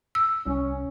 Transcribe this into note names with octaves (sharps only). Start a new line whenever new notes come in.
E6
C2 C#4